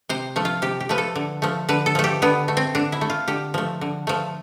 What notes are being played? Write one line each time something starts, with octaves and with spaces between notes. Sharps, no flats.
C3 C5
F3 A3
F4
C3 G4
G4
F3 A3 B4
A4
D3
F3 A3
D3 B4
A4
F3 A3
G4
D3 B3
A3
C4
D3 D4
E4
A3
F4
D3 G4
F3 A3
D3
F3 A3